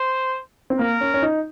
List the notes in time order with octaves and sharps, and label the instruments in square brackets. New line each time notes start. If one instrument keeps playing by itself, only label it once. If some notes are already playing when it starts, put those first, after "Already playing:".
Already playing: [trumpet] C5
[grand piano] C4
[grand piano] A#3 [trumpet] A#4
[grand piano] C#4
C#4
D#4